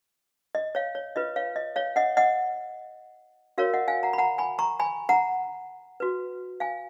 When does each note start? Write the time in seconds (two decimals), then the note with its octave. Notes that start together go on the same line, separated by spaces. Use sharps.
0.55 D#5
0.75 C#5 F5
0.95 C#5
1.16 F4 B4 D#5
1.36 C#5 F5
1.56 D#5
1.76 C#5 F5
1.96 D#5 F#5
2.17 D#5 F#5
3.58 F#4 A#4 C#5 F5
3.74 D#5 F#5
3.88 F5 G#5
4.03 F#5 A#5
4.13 B5
4.18 F#5 A#5
4.38 G#5 B5
4.59 A#5 C#6
4.80 G#5 B5
5.09 F#5 A#5
6.00 F#4 B4
6.60 F5 G#5